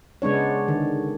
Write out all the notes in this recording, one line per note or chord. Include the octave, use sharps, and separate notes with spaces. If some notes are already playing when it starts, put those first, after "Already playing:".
C#3 G#3 B3 D4 C#5
D3 D#3